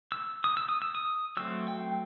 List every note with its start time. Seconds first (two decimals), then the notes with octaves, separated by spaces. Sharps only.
0.12 E6
0.44 D#6
0.57 E6
0.69 D#6
0.82 E6
0.95 D#6
1.37 F#3 A3 C4 E6
1.68 G5